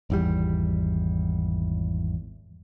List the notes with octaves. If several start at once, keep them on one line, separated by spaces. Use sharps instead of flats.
G#1 E2 G3